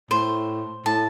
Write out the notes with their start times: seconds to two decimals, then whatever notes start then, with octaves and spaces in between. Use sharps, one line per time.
0.11 A2 C5
0.86 A2 A5